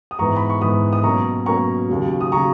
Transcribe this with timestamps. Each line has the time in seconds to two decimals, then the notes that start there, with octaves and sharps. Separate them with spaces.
0.11 D#6
0.19 G#2 E3 B3 A#5 C#6
0.36 B5
0.50 C#6
0.61 G#2 E3 B3 B5 D#6
0.93 D#6
1.04 B2 F#3 A#3 C#4 A#5 C#6
1.46 B2 F#3 A#3 C#4 A#5 C#6
1.89 D#2 C#3 F#3
2.21 D#6
2.32 C#3 F#3 A#5 C#6